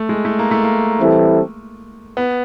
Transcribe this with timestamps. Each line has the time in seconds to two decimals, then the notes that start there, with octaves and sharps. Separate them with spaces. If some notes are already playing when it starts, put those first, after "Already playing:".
Already playing: A3
0.09 G#3
0.25 A3
0.39 A#3
0.51 A3
0.64 A#3
0.99 E3 G3 C4 E4 A4
2.17 B3